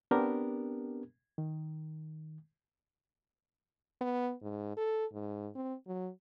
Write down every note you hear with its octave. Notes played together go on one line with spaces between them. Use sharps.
B3 C4 D4 G4 A#4
D#3
B3
G#2
A4
G#2
C4
F#3